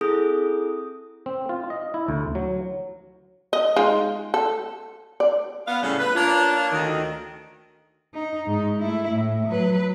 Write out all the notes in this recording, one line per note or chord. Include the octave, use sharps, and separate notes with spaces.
C4 E4 G#4 A4 D#6 G6
C4
F4
D#5
E4
D2
F#3
D#5
G#3 D#4 F4
A4
D5
B3 F5
A2 C#3 G3 C#4
B4
A#3 D4 F4 C#5
D2 D#3
D#4
G#2 D#4
A3 E4
A2
F#3 B4